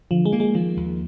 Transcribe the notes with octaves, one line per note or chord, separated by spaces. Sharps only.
D3 F3
G#3
A#3
G#3
D#3 F3
D#2